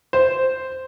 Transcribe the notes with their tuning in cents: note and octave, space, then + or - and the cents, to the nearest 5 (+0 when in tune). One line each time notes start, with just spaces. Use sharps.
C5 -10